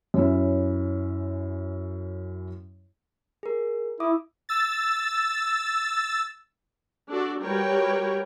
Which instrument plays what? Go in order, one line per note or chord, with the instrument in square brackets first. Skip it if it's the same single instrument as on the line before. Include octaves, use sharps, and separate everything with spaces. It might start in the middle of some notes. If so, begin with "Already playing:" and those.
[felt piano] F#2 C#4 E4
[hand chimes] G#4 A#4
[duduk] E4 [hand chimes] E5 D6 D#6
[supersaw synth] E6 A6
[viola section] D4 F#4 A4 D5
G3 F#4 A#4 B4 C#5 G5